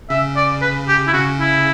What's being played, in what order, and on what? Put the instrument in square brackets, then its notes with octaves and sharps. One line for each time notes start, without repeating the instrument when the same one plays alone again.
[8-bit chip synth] C#3 [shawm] E5
[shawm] D5
B4
G4
E4
[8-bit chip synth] C#3 [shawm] F#4
[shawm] E4